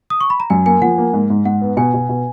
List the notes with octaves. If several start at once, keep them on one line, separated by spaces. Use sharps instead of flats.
D#6
C#6
B5
A#5
F#2 G#5
A#3 G#5
F3 F#5
A#3
G#2
G#2
G#2 F#5
B3
B2 G#5
B2
B2